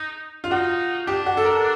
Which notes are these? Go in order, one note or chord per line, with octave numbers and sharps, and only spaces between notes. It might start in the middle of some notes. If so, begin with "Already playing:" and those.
Already playing: D#4
F4
D#4 F#4
D4 G4
F#4
A4
A#4